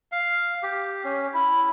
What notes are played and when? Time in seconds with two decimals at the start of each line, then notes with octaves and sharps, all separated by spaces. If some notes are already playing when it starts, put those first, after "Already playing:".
0.12 F5
0.63 G4
1.04 C#4
1.34 E4